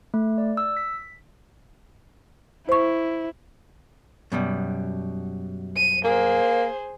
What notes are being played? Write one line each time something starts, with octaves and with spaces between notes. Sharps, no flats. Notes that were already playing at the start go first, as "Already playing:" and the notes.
A3
D5
E6
B6
E4 C5 C#6
F#2 B2 G3
D#7
A#3 G#4 C5